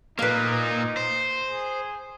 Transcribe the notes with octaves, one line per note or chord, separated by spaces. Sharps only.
A#2 A#3 D#4 B4 F5
C5
G#4